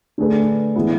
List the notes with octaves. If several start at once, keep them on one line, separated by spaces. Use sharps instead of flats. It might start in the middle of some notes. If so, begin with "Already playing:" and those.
D3 A3 D4 G#4 B4
E3 G#3 B3 E4